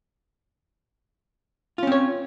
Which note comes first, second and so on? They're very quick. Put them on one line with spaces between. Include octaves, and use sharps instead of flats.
F4 C#4 C4 C#5